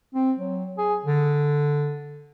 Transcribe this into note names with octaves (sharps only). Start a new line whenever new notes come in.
C4
F#3
G#4
D3